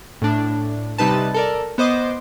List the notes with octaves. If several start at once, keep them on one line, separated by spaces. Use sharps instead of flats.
A2 D4
C3 G3 D#4 B4 A5
A4 A#4 D5
B3 C5 D#5 D6